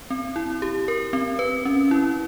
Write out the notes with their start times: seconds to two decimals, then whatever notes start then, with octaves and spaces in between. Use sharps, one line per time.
0.10 C4
0.36 E4
0.62 G4
0.88 A#4
1.13 C4
1.39 B4
1.65 C#4
1.91 E4